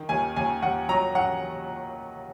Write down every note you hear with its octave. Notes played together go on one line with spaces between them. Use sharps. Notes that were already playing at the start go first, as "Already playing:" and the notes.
Already playing: D#3
D#2 G#5
D#2 G#5
D#2 F#5
F#3 A#5
F#3 F#5